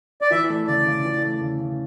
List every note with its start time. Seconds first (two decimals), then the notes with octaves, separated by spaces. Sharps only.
0.21 D5
0.31 E3 E5
0.49 A3
0.67 C#3 D5
0.86 C#3
1.05 E3
1.23 A3
1.41 C#3
1.59 C#3